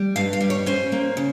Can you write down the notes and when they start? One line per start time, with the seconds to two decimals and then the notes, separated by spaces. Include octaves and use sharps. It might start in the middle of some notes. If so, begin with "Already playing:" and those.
Already playing: G3
0.16 G2 F5
0.33 F5
0.41 G3
0.50 C#5
0.66 C#4 C5
0.92 A#3
1.17 C#3